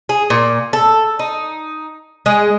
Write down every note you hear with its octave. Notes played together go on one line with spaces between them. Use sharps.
G#4
A#2
A4
D#4
G#3